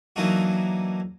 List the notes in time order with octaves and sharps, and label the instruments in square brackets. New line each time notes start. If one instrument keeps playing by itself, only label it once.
[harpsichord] E3 F#3 A#3 D4 D#4 F#4